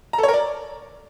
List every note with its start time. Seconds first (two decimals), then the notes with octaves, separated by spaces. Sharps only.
0.13 A#5
0.18 A4
0.23 C#5
0.28 A#4
0.33 D5